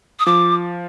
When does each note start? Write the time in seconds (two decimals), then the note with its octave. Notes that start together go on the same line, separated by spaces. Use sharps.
0.20 D#6
0.26 F3 D6